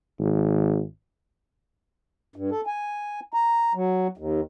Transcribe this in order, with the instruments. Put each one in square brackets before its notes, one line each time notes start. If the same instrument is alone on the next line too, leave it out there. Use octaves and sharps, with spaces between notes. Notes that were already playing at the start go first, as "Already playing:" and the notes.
[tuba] G#1
[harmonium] G2
A4
G#5
A#5
F#3
D#2